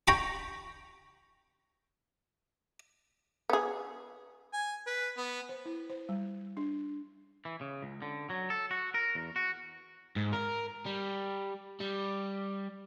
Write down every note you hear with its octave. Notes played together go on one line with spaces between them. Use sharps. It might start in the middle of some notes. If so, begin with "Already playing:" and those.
G5 A#5 B5 C#6
B3 G#4
G#5
B4
B3
C5
E4
C5
G3
D4
E3
C#3
C#2
D3
F#3
A4
F#4
A#4
E2
F#4
G#2
A#4
G3
G3